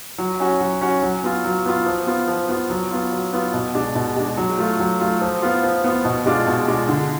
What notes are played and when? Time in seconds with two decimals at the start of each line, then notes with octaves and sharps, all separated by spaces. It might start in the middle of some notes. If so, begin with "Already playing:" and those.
0.18 F#3
0.40 C#4 F#4
0.61 F#3
0.81 C#4 F#4
1.03 F#3
1.23 B3 F4
1.45 F#3
1.65 B3 F4
1.86 F3
2.07 B3 F4
2.28 F3
2.49 B3 F4
2.70 F#3
2.91 B3 F4
3.12 F#3
3.33 B3 F4
3.53 B2
3.75 G#3 D4
3.95 B2
4.16 G#3 D4
4.37 F#3
4.58 A3 F4
4.79 F#3
5.00 A3 F4
5.21 F3
5.42 B3 F4
5.63 F3
5.84 B3 F4
6.05 B2
6.26 G#3 D4 F4
6.47 B2
6.68 G#3 D4 F4
6.89 D3